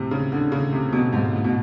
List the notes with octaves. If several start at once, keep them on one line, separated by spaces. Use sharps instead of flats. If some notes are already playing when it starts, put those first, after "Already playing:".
Already playing: A2 C3
C#3
D3
C#3
C3
B2
G#2
A2
B2